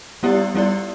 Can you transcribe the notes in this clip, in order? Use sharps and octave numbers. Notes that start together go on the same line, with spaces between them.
G3 B3 E4 G4 D5
G3 B3 E4 G4 D5